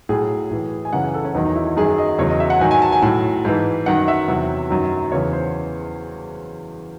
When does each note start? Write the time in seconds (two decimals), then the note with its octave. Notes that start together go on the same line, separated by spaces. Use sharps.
0.09 A2 F#3 G#4
0.51 A2 E3
0.85 G#5
0.93 F#2 C#3 E3 F#5
1.04 G#5
1.14 A4
1.25 C#4
1.35 E2 D#3 F#3 D#4
1.45 D#4
1.56 E4
1.67 E4
1.77 F#2 D#3 F#3 G#4
1.98 D#5
2.19 E2 C#3 F#3 C#5
2.30 D#5
2.40 E5
2.50 F#5
2.60 G#2 D#3 F#3 G#5
2.71 G#5
2.82 A5
2.92 G#5
3.02 A2 F#3 A5
3.45 G#2 E3
3.86 F#2 D#3 F#3 F#5
4.08 E5
4.28 E2 C3 F#3
4.70 F#2 D#3 F#3
5.12 E2 C#3 E3 C#5
5.33 C5